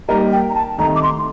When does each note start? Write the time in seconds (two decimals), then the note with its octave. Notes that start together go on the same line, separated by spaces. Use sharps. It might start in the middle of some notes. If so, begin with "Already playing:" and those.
0.09 G3 A#3 D#4 A#4 D#5 A#5
0.32 G5
0.49 A#5
0.55 A5
0.78 C2 C3 D#3 A3 D#4 A#5
0.96 D6
1.03 C6